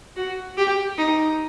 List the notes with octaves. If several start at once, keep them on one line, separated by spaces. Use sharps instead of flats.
F#4
G4
D#4